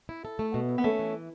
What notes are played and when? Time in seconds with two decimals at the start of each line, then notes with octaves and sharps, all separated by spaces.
0.09 E4
0.25 A4
0.39 A3
0.54 B2
0.69 E4
0.78 B3
0.84 A3 C#4
0.99 E3